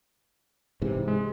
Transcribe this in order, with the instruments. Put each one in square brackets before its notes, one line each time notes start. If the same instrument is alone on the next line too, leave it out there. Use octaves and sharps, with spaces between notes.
[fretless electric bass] G#2 C3 E3
[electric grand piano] G#3